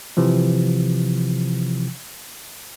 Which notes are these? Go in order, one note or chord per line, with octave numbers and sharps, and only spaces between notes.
C3 E3 F3